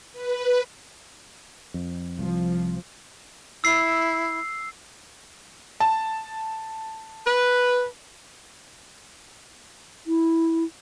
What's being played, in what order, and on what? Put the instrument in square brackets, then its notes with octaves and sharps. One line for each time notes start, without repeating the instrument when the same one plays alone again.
[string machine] B4
[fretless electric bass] F2
[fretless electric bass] C2 [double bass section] F3
[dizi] E4 [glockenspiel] E6 C7
[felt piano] A5
[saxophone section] B4
[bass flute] E4